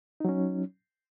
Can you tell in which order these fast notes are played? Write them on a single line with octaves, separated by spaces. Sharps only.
D#4 F#3 C#4